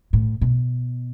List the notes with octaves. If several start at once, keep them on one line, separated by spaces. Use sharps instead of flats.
A2
B2